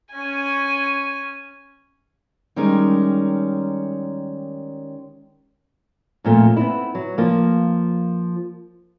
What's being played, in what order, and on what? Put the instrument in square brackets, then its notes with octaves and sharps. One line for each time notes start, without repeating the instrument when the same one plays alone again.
[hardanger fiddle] C#4 G#5
[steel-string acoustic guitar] D#3 G3 G#3 C#4 A#4
[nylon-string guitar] F2 A#2 A3 F4
B3 C4 E4
F#3
F3 A#3